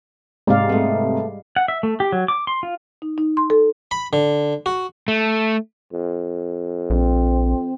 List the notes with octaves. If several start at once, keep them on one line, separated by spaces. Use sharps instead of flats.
G#2 C3 G#3 D5 F5
G3 A3 B3
F#5
E5
A3
G4
F#3
D6
C6
F4
D#4
D#4
C6
A4
B5
D3
F#4
A3
F2
A#1 C4